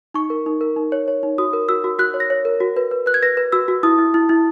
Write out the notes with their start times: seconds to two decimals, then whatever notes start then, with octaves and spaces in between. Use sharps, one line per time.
0.14 D#4 C#6
0.30 A#4
0.46 D#4
0.61 A#4
0.76 D#4
0.92 C#5
1.08 C#5
1.23 D#4
1.38 F#4 D#6
1.53 A#4
1.69 F#4 E6
1.84 F#4
1.99 F#4 F#6
2.14 C#5
2.20 A#6
2.30 C#5
2.45 A#4
2.60 F#4
2.77 B4
2.91 B4
3.06 B4 F#6
3.14 G#6
3.23 B4 A#6
3.37 B4
3.52 F#4 E6
3.68 F#4
3.83 E4 D#6
3.99 E4
4.14 E4
4.29 E4